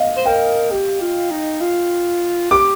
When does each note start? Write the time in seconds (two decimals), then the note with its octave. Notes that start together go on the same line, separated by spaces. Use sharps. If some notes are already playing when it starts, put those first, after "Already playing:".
Already playing: D#5 F5
0.17 C5
0.25 A#4 G5
0.71 G4
1.01 F4
1.30 D#4
1.61 F4
2.51 G4 D6